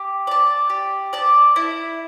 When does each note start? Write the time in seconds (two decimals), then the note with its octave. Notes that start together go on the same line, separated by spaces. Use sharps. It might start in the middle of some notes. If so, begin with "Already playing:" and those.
Already playing: G4
0.27 D5 A5
0.70 G4
1.13 D5 A5
1.56 E4